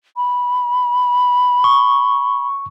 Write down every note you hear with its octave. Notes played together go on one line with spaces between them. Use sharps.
B5
C#6